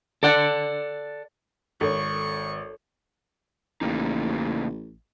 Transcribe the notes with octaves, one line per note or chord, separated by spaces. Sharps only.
A4 D5 F#5
G#1 A4 C#5 C#6
A1 C#3 A#3 D#4